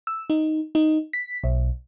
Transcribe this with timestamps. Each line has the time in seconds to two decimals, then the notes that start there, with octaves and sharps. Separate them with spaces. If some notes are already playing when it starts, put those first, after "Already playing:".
0.07 E6
0.30 D#4
0.75 D#4
1.13 B6
1.44 B1